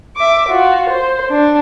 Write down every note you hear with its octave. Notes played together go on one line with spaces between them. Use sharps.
E5 D6
F4 F#4
C5
D4